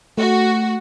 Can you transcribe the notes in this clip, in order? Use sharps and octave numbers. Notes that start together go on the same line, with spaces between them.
A3 F#4